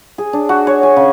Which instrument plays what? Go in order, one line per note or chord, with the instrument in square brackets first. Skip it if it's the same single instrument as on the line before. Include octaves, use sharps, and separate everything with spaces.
[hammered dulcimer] G#4
D4
F#4
C#5
G#5
C#3